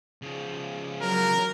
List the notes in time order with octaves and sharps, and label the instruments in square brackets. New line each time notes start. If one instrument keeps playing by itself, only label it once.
[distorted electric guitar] C#3 F3
[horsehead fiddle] F#3 [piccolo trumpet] A#4